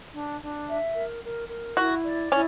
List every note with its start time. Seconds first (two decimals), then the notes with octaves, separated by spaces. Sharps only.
0.12 D4
0.41 D4
0.68 E5
0.94 A#4
1.22 A#4
1.50 A#4
1.77 E4 F#4
2.04 D5
2.32 C#4 E4